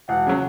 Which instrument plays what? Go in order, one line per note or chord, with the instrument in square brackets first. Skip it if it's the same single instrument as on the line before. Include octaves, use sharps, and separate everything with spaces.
[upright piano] E1 [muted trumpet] F#5
[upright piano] C#3 F#3